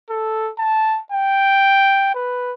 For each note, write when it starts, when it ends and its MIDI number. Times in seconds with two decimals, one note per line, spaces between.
0.10 0.51 69
0.58 1.00 81
1.12 2.13 79
2.15 2.54 71